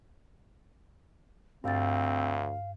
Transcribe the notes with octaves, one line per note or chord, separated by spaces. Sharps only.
D2 G2 C4 F5 A6